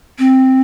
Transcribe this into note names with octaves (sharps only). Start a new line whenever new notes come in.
C4